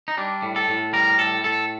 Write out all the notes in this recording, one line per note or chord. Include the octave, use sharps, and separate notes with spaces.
D#4
G3 D4
A2
A4
A2
G3 A#4
A2 A4
A2 A4